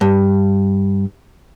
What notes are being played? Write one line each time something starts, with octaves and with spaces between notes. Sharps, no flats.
G2